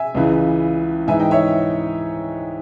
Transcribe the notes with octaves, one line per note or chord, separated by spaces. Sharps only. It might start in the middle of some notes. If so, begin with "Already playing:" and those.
Already playing: E5 G#5
C#2 C#3 E3
G#2 E3 E5 G#5
D#5 G5
C#5 E5